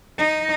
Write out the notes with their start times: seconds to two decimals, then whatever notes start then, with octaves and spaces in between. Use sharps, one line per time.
0.18 D#4